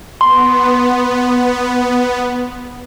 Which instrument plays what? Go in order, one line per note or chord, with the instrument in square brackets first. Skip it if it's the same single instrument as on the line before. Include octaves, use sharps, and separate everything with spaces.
[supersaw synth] B3 [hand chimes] C6